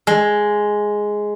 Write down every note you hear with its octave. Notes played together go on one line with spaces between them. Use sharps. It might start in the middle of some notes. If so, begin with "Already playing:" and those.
G#3